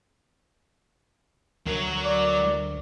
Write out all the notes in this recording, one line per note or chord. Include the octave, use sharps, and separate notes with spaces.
D2 F#3 A#4 C#5
D5